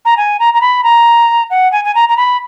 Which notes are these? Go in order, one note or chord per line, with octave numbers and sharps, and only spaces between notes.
A#5
G#5
A#5
A#5
B5
A#5
F#5
G#5
G#5
A#5
A#5
B5